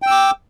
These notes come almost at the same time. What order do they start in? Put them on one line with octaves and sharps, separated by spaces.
G5 E6 D6